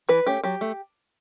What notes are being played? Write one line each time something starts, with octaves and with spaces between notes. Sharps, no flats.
E3 B4
A3 C#4 G4
F#3 G4
A3